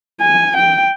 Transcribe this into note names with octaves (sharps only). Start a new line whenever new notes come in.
G#5
G5